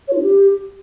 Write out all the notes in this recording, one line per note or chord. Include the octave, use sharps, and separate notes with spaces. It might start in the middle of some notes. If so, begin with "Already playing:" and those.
C#5
F4
D4
G4